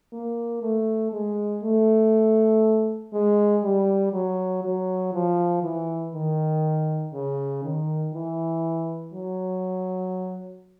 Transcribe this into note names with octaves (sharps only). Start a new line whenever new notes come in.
A#3
A3
G#3
A3
G#3
G3
F#3
F#3
F3
E3
D#3
C#3
D#3
E3
F#3